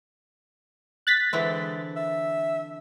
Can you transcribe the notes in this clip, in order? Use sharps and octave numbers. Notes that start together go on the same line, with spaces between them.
F#6 A6 B6
D3 E3 G#3 C4
E5